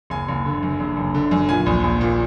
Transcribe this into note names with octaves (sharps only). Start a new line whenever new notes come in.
F#1 G#5
F#1
D3
F#2
F#1
F#1
D3
F#2
A#2 G#5
A#1
A#1
A#2